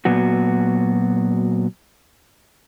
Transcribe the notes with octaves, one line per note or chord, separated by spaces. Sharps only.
A#2 F#3 B3 F#4